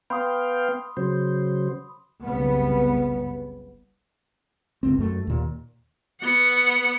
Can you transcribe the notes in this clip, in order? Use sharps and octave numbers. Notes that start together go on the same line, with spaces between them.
B3 F5 G5 B5 C6 D#6
C#3 F#3 C5
F#1 C2 C#3 G3 B3
G1 C#2 C4
F#2 A3
D#2 A#2
B3 F#5